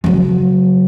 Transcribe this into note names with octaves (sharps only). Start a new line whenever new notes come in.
C#3 F#3